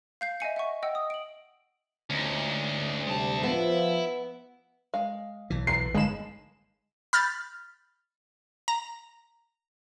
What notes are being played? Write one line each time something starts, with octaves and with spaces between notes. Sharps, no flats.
F5 G6 C7
D#5 E5 G#5 C#7
E5 F#5 C#6
D#5 F#5 G5 E6
D#6
D7 F#7
D2 C#4 D#4
C3 G3 G#3 A5
F3 B3 E4
G#3 F5
B1 E3
B3 A#5 C7
G1 F3 G#3 D#4 B5 E7
B5 F6 G6 A6
A#5